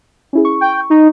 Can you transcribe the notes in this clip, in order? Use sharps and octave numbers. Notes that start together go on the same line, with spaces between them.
C#4 E4 G#4
C#6
G5
D#4